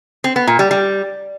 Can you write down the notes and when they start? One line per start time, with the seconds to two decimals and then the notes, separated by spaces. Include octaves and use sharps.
0.24 C4
0.36 B3
0.47 A#2
0.59 G3
0.71 G3